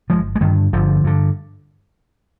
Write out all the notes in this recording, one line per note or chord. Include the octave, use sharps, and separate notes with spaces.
G1 F3 G#3
G#3
G2 D3 D#3 G3
G1 D3 F3
G2 D3